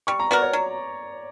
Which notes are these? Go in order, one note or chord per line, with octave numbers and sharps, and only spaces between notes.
G3 C#6
A#5
B3 F#4 A#4 D5
C#5
F#3